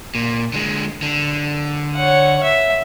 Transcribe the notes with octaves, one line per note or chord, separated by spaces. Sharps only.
A#2
D3 G#3
D3
C#5 F#5
E5